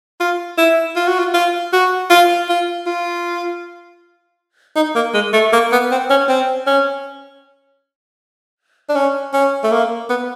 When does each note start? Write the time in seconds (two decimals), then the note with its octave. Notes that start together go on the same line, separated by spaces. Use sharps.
0.20 F4
0.58 E4
0.96 F4
1.08 F#4
1.19 F4
1.34 F4
1.73 F#4
2.10 F4
2.49 F4
2.87 F4
4.76 D#4
4.96 A#3
5.14 G#3
5.33 A3
5.53 A#3
5.72 B3
5.92 C4
6.10 C#4
6.29 C4
6.67 C#4
8.89 D4
8.96 C#4
9.33 C#4
9.64 A3
9.72 A#3
10.10 B3